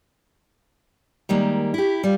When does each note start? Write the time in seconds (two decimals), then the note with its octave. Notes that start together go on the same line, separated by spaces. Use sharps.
1.29 D#3 G3 G#3 A#3
1.74 E4 G4
2.03 G3 F4